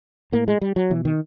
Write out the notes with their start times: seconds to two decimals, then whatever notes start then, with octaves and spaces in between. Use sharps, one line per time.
0.32 A2 A#3
0.48 G#3
0.61 G3
0.76 F#3
0.90 B2 E3
1.05 D#3